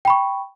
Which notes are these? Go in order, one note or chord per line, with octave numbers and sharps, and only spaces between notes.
G5 B5 C#6